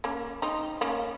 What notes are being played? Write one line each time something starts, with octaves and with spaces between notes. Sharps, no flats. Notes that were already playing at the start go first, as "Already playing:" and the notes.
A#3 C#4
C4 D#4
A#3 C#4